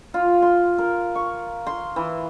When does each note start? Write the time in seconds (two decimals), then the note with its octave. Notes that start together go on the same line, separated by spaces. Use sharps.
0.14 F4
0.42 C6
0.78 A#4
1.15 C#6
1.67 C6
1.96 E3